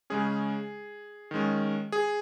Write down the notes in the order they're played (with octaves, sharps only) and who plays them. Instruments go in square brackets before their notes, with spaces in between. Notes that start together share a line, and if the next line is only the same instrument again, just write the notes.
[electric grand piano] C#3 G#3 C#4 G#4
D#3 G#3 C#4
G#4